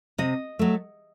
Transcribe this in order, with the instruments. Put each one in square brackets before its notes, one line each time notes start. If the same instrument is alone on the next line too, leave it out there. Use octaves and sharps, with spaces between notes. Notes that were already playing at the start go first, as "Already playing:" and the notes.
[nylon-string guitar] C3 D#5
F#3 A3